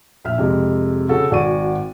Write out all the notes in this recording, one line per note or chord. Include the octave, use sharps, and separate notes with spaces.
A#1 E5 F6
F2 C3 G#3
C#3 F#4 G#4 A4
G#1 F#4 D5 G#5 C#6 D#7